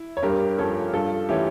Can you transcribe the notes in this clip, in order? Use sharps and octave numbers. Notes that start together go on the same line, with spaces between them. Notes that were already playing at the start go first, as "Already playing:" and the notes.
Already playing: E4
C#5
G2 G4 A#4
F3 C#4 A4 C#5
G2 F4 A4
E3 A3 C#4 E4 G4